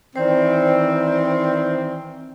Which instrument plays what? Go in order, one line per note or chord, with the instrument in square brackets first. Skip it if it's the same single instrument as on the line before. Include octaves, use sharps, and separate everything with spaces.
[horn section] D#3 E3 C4 [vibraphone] C5 D5